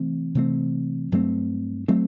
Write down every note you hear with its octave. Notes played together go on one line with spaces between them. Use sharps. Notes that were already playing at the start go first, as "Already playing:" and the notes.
Already playing: C3 E3 A3 C4
C3 E3 A3 C4
G2 F#3 A3 C4
F#3 A3 C4